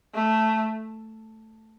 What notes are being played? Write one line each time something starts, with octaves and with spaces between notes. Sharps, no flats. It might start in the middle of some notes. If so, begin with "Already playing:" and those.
A3